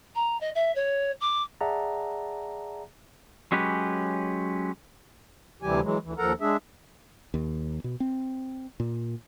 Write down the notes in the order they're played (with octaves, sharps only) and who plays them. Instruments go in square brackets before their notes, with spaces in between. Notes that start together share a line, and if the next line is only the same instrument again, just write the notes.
[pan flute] A#5
D#5
E5
C#5
D6
[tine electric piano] G#4 D5 E5 F#5 A5 A#5
[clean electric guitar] F#3 G#3 C#4 G4 B4
[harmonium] D2 C3 E3 G3 G4 G#5
E3 F#3 G#3
D2 E3
D#2 F3 A4 A#4 F#5 A#5
G#3 D4 G#4 E5
[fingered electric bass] D#2
B2
C4
A#2